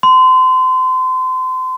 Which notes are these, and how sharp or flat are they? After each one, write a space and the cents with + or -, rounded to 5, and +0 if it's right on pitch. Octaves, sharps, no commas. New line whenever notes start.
C6 -30